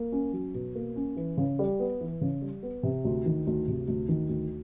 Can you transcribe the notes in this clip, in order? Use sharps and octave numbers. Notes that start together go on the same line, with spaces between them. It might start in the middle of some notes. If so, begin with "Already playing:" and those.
Already playing: A#3
C#4
F#3
B2
A#3
C#4
E3
C#3
G3
B3
E3
C#3
G3
B3
C3
D2
D#3
D2
C3
D2
D#3
D2